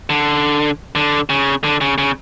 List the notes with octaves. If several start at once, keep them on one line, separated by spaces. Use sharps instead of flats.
D3
D3
C#3
D3
C#3
C#3